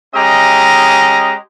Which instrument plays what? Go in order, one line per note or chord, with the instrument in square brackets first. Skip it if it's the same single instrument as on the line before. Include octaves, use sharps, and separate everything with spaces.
[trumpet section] G#3 C#4 G4 D#5 A#5